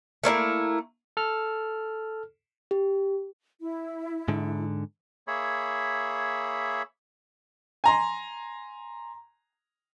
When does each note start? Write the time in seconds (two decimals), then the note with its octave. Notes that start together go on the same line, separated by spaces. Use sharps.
0.24 A3 A#3 C#4 E4
1.17 A4 F6
2.71 G4
3.61 E4
4.28 G#2 D3
5.28 A#3 G#4 C#5 E5 B5
7.84 G#5 A#5 C6